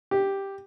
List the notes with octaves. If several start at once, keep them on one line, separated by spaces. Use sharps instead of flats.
G4